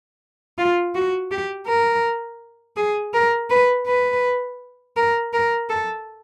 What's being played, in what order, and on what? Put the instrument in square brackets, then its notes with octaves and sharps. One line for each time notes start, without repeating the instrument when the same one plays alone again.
[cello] F4
F#4
G4
A#4
G#4
A#4
B4
B4
A#4
A#4
A4